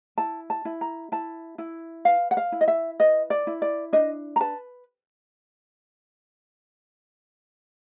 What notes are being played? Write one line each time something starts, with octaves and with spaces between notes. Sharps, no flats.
E4 A5
A5
E4
A#5
E4 A5
E4
B4 F5
F#5
F5
E4
D#5
E5
B4 D#5
D5
E4
D5
D4 D#5
A#5
B4 A5